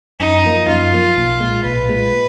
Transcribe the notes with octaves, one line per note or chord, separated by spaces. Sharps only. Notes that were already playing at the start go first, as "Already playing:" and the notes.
F#2 D#4
F3 A#3
F#2 F4
F3 A#3
B1
A#2 G#3
B1 B4
A#2 G#3